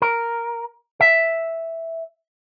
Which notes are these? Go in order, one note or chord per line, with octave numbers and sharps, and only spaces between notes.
A#4
E5